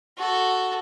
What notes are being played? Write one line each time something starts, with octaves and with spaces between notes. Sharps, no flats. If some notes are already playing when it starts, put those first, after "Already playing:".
F#4 A4